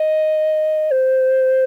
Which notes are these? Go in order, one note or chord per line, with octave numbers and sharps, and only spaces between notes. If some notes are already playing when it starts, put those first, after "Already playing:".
Already playing: D#5
C5